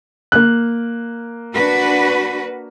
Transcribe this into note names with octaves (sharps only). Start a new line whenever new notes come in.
A#3 F#6
D4 F#4 B4